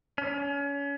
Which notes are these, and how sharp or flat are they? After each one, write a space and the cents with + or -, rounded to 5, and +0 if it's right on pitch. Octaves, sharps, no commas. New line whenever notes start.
C#4 +30